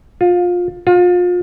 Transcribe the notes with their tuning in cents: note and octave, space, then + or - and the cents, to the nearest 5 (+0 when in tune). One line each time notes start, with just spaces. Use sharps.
F4 +20
F4 +30